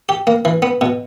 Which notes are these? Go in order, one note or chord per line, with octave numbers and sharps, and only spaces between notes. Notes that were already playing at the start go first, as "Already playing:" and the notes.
G4
A#3
E3
B3
B2